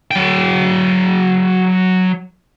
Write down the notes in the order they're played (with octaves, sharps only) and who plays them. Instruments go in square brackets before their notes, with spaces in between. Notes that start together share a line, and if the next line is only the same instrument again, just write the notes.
[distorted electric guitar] F#3 G5